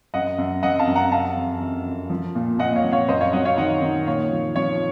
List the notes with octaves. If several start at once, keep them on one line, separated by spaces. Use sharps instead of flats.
F#2 D#5 F#5
F#2
F#2 D#5 F#5
F5 A5
F#2
F#5 A#5
C3 F5 A5
F2
F2
F2
F3
A#2
A#2 D#5 F#5
C#5 F5
F3
C#5 F5
F#2 C5 D#5
C#5 F5
F#3 D#5 F#5
C#5 F5
D#3 D#5 F#5
D#3
A#2 C#5 F5
F3
F3 C#5